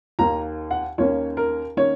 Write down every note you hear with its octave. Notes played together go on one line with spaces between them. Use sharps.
D#2 D#3 A#3 A#5
F#5
D#2 D#3 A#3 C#4 C#5
A#4
D#3 A#3 C#4 C#5